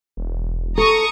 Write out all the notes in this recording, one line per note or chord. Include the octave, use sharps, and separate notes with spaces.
E1
A4 A#5 C#6 D#6